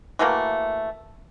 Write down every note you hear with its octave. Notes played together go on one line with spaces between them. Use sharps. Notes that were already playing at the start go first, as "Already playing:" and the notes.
E3 F#3 A3 A#3